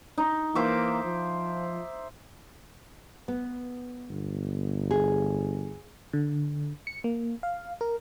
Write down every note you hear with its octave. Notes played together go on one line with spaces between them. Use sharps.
D#4
E3 A#3 C5 E5 D6
F3
B3
G1
G#4
D3
C#7
A#3
F5
A#4